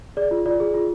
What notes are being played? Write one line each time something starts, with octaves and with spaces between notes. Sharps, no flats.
G#4 D5
F4
F4 D5
G#4
F4